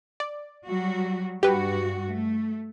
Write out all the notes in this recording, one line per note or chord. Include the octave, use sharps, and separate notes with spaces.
D5
F#3 G3 F#4
G2 F#4 G4 B4
A3